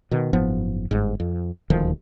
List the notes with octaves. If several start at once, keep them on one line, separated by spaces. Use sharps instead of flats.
B2 D#3
F#1 G#2 F3 B3
G1 G#2
F2
D#1 D2 D#3 F3